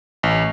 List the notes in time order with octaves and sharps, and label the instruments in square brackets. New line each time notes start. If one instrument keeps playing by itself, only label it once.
[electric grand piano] A1